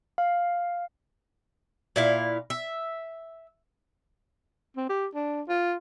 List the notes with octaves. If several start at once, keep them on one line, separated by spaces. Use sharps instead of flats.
F5
A#2 E4 F5
E5
C4
G4
D4
F4